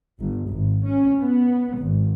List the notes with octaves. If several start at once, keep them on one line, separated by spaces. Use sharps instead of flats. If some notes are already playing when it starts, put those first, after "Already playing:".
G1
G#1
C#4
B3
G#1